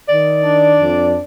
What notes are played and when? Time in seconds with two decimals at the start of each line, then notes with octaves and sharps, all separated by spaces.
0.09 D#3 D5
0.44 D4
0.78 F2